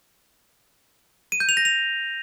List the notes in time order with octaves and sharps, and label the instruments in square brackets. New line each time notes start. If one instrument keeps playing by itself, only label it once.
[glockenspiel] D#7
G6
F7
A#6
F7